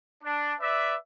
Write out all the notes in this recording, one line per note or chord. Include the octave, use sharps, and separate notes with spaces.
D4
B4 D5 E5